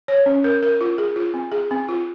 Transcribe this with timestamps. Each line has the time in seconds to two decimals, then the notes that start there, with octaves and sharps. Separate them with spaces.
0.08 C#5
0.26 C#4
0.44 A#4
0.63 A#4
0.81 F4
0.98 G#4
1.16 F4
1.34 C4
1.52 G#4
1.71 C4
1.89 F4